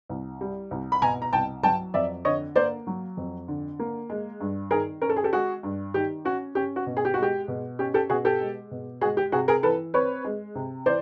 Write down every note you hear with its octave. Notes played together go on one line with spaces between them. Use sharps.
C2
G3
C2
B5
B2 G#5 A#5
A#5
C2 G5 A5
F#3 G5 A5
F2 D5 E5
D3 C#5 D#5
A#3 C5 D5
F#3
F2
D3
A#3
G#3
G2
D#3 G#4 A#4
C#4 A#4
A4
G#4
G4 A4
G#3 F#4 G#4
G2
D#3 G4
C#4 F#4
C#4 G4
F#4
B2
G#4
G4
G#3 F#4
G4
B2
C#4 G4
G4 A4
B2 F#4 G#4
G4 A4
G#3
B2
G#3 F#4 G#4
G4
C3 F#4 G#4
G#4 A#4
E3 A4 B4
C4 B4 C#5
G#3
C3
E3 C5 D5